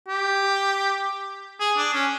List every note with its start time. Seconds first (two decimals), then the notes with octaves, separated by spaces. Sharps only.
0.08 G4
1.60 G#4
1.77 D4
1.94 C#4